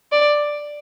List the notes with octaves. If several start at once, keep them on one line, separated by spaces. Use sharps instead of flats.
D5